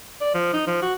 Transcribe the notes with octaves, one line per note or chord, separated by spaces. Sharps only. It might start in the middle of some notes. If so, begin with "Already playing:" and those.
D5
F3
D#4
F3
F#4